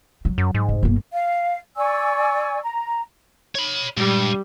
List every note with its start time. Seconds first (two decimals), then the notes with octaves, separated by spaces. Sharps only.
0.25 F#3
0.38 F#2
0.55 G#2
0.69 F1
0.83 G1 A#3
1.13 F5
1.76 D5 G#5 C#6 E6
2.64 A#5
3.55 C#5 B5
3.97 G2 A#2 G3 G#3